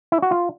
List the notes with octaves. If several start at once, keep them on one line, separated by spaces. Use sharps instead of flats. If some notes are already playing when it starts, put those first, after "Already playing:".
E4
F#4
F4